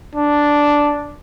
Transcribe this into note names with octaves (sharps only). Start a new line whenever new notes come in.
D4